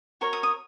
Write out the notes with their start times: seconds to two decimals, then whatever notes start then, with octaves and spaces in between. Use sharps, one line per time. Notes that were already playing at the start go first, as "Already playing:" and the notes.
0.21 F#4 A#4 C#5
0.33 D#6
0.43 D#6